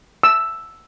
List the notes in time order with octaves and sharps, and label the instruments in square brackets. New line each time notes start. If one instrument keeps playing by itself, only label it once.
[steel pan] E6